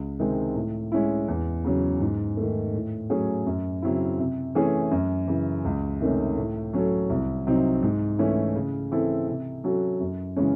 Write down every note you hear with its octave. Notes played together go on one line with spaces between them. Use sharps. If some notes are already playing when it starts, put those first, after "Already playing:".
Already playing: C#2
C3 D#3 G#3 C4
A2
G#3 C#4 E4
E2
C#3 F#3 C#4
G#2
D#3 A3
A2
F#3 A3 C#4 G#4
F#2
C#3 F#3 C4 E4
C3
E3 A3 C#4 G#4
F#2
C#3 E3
C#2
C3 D#3 A3 C#4
A2
F#3 C#4 F#4 A4
C2
C3 F#3 C4 D#4
G#2
E3 A3 C#4 E4
C#3
E3 C4 E4 A4
C3
F#3 C#4 F#4 A4
F#2
C#3 E3 G#3 C#4